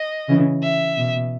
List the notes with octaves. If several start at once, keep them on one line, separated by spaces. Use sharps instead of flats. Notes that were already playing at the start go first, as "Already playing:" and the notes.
Already playing: D#5
C#3 E3
E5
B2